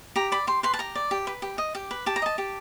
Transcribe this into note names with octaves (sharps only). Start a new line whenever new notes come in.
G4 A#5
D5 B5
G4 C6
B4 C6
A5
G4 A#5
D5
G4
B4
G4
D#5
G4
B4
G4 A5
A#5
D#5 A5
G4